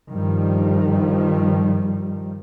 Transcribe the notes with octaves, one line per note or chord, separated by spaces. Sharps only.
G2 D#3 F3 G3